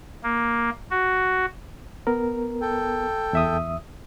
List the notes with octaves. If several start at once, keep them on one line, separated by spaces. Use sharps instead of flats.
A#3
F#4
B3 A#4
A4 G5
E2 E5 D#6